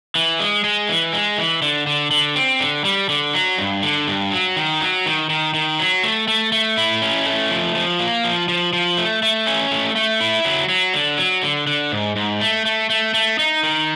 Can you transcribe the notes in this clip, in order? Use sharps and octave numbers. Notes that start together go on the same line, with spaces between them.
E3
G#3
G#3
E3
G#3
E3
D3
D3
D3
C4
D3
G3
D3
F#3
G2
D3
G2
F#3
D#3
F#3
D#3
D#3
D#3
F#3
A3
A3
A3
E4
C#4
A3
F3
F3
A#3
F3
F3
F3
A3
A3
C#4
A3
A3
E4
F#3
F#3
D3
F#3
D3
D3
G#2
G#2
A3
A3
A3
A3
D#4
D#3